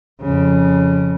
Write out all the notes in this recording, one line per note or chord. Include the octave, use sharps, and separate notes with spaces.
F2 C#3